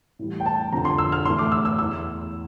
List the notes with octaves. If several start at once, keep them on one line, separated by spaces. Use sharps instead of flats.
A2 E3 G3
G5
A5
F2 D3 F3 A#5
C6
E6
F6
A2 E3 A3 C6
D6
E6
E6
E2 E3 A3 E6